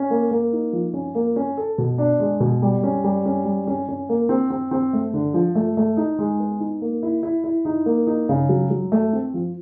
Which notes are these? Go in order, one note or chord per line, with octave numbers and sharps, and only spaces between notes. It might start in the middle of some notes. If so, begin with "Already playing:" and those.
Already playing: C#4
A#3
A#3
D#4
F3
C#4
A#3
C#4
A4
B2
D4
G#3
B2
G3
C#4
G3
C#4
G3
C#4
C#4
A#3
C4
C4
C4
A3
D3
F3
A3
A3
D#4
G#3
B3
D#4
A#3
E4
E4
E4
D#4
A#3
D#4
C#3
F#3
F#3
A3
C4
F3